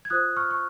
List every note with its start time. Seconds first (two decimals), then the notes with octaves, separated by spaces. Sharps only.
0.05 G#6
0.10 F4 C5 D#6 F#6
0.36 C#6 F6
0.51 C#6